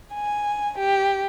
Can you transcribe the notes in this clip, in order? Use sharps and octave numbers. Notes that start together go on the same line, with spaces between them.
G#5
G4